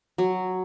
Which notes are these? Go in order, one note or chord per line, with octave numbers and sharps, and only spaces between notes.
F#3